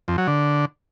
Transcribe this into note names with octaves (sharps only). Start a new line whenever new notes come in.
F2
F#3
D3